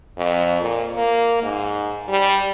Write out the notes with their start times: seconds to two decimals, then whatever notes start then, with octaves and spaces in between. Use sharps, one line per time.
0.17 F2
0.62 A#2
0.96 A#3
1.43 G#2
2.08 G3